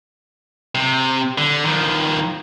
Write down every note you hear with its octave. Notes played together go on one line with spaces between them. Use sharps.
C3
D3
D#3 F3